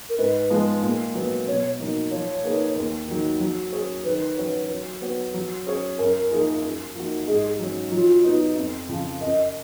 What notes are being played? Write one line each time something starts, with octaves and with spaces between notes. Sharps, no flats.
A#4
G#2 B4
F3 G#3 B3
A#2
F#3 B3
B2 C#5
F#3 A#3 D#4
F3 C#5
A#3 D#4 G#4 B4
D#2
D#3 F#3
F#3
C#4 G#4 C#5
D#3 B4
F#3 C#4 F#4 C#5
F#3
B3 F#4 C#5
F#3
C#4 G#4 C#5
F#2 A#4
F3 A#3 D#4 G#4
F#2
F3 A#3 D#4 F#4
G#2 G#4
F#3 C#4
F#3 F4
B3 D#4
F2
C#3 F3
F#2 D#5